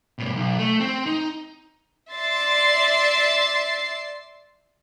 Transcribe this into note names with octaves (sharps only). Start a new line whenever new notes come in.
G2 B2
B1
A3
C4
D#4
D5 E5 C6 A6 C7